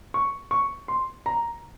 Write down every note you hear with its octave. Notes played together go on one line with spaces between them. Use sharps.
C#6
C#6
C6
A#5